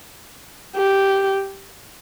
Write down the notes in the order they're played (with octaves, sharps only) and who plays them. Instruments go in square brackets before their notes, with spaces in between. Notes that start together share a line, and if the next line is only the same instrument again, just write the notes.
[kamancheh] G4